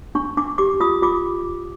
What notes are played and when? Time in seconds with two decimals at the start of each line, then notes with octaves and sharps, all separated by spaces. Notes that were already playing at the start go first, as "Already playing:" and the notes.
0.15 D4 C#6
0.37 D4 D6
0.58 G4 D6
0.80 F4 D#6
1.02 F4 D6